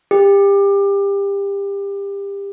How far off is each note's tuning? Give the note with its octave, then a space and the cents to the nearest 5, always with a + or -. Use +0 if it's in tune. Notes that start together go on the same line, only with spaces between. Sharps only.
G4 +25